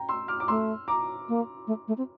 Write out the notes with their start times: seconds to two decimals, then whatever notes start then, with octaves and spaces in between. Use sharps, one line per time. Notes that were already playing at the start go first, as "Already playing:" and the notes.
Already playing: G5 A#5
0.09 C6 E6
0.28 D6 F6
0.40 D6
0.48 A3 C6 E6
0.88 A#5 D6
1.28 A#3
1.67 A3
1.88 A3
1.97 C4